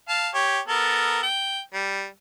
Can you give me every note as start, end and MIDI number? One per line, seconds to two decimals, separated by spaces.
0.09 0.29 77
0.09 0.29 81
0.34 0.59 67
0.34 0.59 73
0.68 1.23 59
0.68 1.23 69
0.68 1.23 70
1.23 1.59 79
1.74 2.05 55